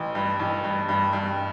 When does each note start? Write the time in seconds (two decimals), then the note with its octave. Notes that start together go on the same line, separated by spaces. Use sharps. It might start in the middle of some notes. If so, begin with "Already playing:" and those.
Already playing: A1
0.15 G2
0.39 A1
0.64 G2
0.89 G2
1.13 G2